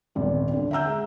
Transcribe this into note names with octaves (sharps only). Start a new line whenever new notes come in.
D#1 G#1 G3 B3
F2 D3
E5 F#5 A#5 E6 G6
G#3